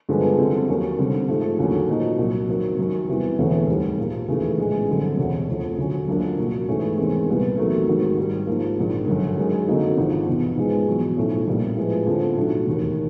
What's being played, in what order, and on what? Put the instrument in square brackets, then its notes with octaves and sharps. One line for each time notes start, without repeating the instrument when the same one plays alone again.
[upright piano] G2 D3 F3 G#3 B3
F2 D3 G3 C4 E4
D#2 D#3 F#3 A#3 C#4
F1 F2 D3 G3 C4
G#2 F3 A3
D#2 D3 F#3 A#3 C#4
A#2 F3 A#3 D#4 F#4
C2 A#2 F#3
F2 C3 D#3 F#3 A#3
F#2 D#3 F#3
E2 C3 E3 G3
E1 D2 C3 E3 A3
G#2 D#3 G3
A#2 F3 A#3
D#2 C#3 E3 A3
A#1 A2 E3 G#3
G1 F#2 D3 G3 C4
E1 D2 C3
F2 C3 F3 A3
D2 D3 F#3 A3 C#4
F#2 D3 F3 A#3 D4
C2 A#2 F#3 A#3
G#2 E3 A3 C#4
E2 C3 D#3 G#3 C4
C2 A#2 G3 B3
E2 C3 D#3 F#3 A3
G#1 G#2 D#3 F#3
G#2 D#3 G3
G#2 F3 A#3
A#1 G#2 D#3
G1 F#2 D3
F#2 D#3 G#3
F2 D3 F#3 A#3 D#4
G#1 G#2 F3 A#3 D4
F1 E2 B2
G#2 F3 G#3 B3
E2 B2 F#3
B1 A2 F3 A3 C#4
A#1 A#2 G3 A#3
A2 F3 G#3 B3
F2 D3 F3
B1 A2 F#3 A3 D4
E1 D#2 D#3